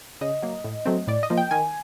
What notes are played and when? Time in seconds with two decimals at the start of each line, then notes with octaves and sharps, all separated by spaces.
0.21 C#3 D#5
0.43 F#3 A#3
0.64 A2
0.85 F#3 A3 C4
1.07 A2 D5
1.23 D#5
1.30 F3 A#3
1.37 G5
1.51 D#3 G#5